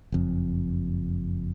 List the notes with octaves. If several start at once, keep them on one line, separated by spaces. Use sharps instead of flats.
F#1 F2